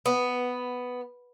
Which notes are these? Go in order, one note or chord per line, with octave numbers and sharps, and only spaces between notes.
B3